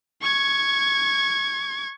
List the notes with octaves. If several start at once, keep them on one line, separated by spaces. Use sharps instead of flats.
C#6 G#6